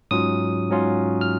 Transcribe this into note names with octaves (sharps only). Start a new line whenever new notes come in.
G#2 F#3 C#4 F4 D#6
G#2 F#3 C#4 F4
F6